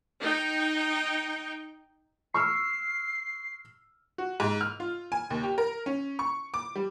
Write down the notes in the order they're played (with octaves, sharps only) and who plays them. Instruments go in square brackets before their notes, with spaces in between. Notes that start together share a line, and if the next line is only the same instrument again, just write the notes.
[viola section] D#4 G5
[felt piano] C#6 E6 F6 [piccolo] C7
[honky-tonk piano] F#4
G#2
F6
F4
G#5
D#2
G4
A#4
C#4
C#6
D6
G3